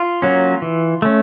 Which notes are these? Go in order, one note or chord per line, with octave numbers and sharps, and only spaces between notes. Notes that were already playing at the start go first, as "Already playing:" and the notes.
Already playing: F4
F#3 A#3 C#4
E3
A3 C#4